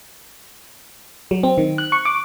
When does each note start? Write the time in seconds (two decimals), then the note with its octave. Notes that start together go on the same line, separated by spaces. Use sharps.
1.31 F#3
1.43 C4
1.58 D#3
1.78 F#6
1.92 C#6
2.05 D6